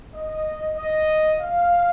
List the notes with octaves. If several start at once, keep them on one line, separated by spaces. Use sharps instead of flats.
D#5
D#5
F5